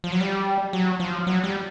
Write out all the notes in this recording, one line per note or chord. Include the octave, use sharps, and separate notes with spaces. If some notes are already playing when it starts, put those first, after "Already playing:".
F3
F#3
G3
F#3
F3
F#3
G3